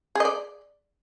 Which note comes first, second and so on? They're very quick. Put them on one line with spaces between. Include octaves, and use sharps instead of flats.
G#4 D#5 D5